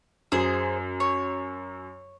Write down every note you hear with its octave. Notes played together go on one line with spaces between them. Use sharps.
F#2 G#4 C5
C#5